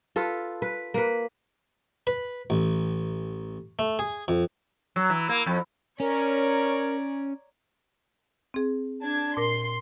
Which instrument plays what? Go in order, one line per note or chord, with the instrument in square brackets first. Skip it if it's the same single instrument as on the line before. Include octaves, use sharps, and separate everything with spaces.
[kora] F4 A4 B4
B4
A#3 B4
[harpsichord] B4
A1
A3
G#4
F2
[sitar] F#3
E3
A#3
F2
[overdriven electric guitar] C#4 [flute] A#4 [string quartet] C#5 D5 A#5
[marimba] C4 G#4
[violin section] D4 A5 G#6
[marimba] A#2 A#4 [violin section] C6 C7